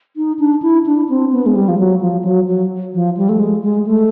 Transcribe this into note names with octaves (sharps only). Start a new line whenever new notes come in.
D#4
D4
E4
D4
C4
B3
G#3
G3
F3
F#3
F3
F#3
F#3
F3
G3
A3
G#3
G#3
A3